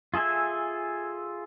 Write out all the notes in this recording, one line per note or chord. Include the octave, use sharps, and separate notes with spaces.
F4 G#4 A4 E5 G#5